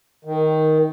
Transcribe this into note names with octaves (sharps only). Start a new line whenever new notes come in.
D#3